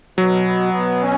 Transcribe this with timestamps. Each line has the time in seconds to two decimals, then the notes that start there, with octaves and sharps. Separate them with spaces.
0.18 B2 F#3
0.46 B3
0.73 B2
1.02 C#4